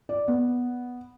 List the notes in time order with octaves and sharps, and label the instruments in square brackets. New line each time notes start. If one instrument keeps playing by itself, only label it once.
[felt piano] D5
B3